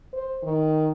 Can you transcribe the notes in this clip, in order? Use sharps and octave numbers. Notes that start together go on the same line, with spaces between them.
C5
D#3